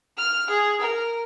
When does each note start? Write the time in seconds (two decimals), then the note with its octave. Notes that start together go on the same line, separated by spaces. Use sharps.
0.18 F6
0.50 G#4
0.81 A#4